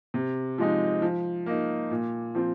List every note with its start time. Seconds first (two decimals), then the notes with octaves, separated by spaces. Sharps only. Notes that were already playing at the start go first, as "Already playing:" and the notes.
0.14 C3
0.58 F3 G#3 D#4
1.02 F3
1.46 A#3 D#4
1.91 A#2
2.35 F3 C4 F4